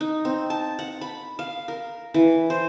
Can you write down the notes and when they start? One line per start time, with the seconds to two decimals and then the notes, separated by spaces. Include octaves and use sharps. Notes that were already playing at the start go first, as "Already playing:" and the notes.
0.01 D#4
0.25 C4
0.50 A5
0.79 F#5
1.01 B5
1.39 F5
1.68 A#4
2.14 E3
2.50 C5